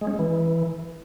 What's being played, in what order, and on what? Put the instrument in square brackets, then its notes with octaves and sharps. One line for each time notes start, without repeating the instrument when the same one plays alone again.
[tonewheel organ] G#3
C#4
G#3
E3